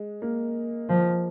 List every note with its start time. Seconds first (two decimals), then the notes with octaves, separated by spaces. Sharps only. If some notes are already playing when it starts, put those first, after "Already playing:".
Already playing: G#3
0.22 A#3
0.89 F3